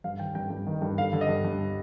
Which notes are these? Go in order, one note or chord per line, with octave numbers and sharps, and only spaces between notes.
G2 F5
D#3 G5
G2 G5
G2
D#3
G2
D3 F5
D3
D#5
G2
G2